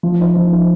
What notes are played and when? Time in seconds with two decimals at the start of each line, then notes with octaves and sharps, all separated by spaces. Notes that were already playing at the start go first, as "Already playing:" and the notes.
0.03 F3
0.19 D#4 C5
0.36 F3
0.52 D#4 C5